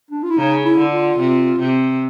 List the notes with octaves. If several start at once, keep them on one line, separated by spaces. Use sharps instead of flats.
D4
F4
E4
C#3 D#4
E4
D3
F4
C3
C3